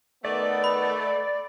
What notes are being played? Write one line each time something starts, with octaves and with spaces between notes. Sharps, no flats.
D#3 A3 B3 D5
B5